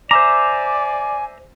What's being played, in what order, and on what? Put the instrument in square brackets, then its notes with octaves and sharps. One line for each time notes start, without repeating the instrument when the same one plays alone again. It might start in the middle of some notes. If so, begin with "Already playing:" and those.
[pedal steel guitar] C5 E5 A#5 [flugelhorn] D5 [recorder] G#5 [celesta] D6